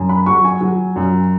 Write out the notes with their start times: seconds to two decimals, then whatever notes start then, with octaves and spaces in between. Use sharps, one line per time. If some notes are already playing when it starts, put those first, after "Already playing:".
Already playing: F#2
0.09 B5
0.26 F#3 C#6
0.44 G#5
0.61 F#3
0.96 F#2